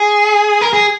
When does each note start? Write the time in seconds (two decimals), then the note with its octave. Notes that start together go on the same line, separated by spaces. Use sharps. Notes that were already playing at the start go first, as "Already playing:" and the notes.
Already playing: G#4
0.61 A#4
0.73 G#4